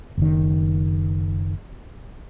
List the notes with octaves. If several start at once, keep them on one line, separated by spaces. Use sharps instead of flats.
F#1 D#3